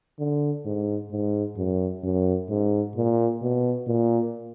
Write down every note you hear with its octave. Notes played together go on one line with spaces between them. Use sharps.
D3
G#2
G#2
F#2
F#2
G#2
A#2
B2
A#2